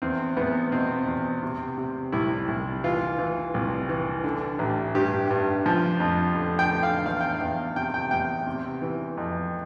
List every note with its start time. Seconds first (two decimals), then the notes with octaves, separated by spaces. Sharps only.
0.02 E2 C4
0.37 E2 B3
0.72 B2 C4
1.07 E2
1.43 C3
1.78 C3
2.12 C2 E4
2.48 C2
2.84 E3 F4
3.19 E3
3.54 C2
3.89 E3
4.24 D3
4.59 A1
4.95 G2 G4
5.31 G2
5.66 F3
6.00 F2
6.35 D3
6.59 G5
6.71 D3
6.83 F5
7.06 E2 F5
7.21 G5
7.34 F5
7.41 E2
7.76 C3 G5
7.94 G5
8.11 E2 G5
8.47 C3
8.82 E3
9.17 F2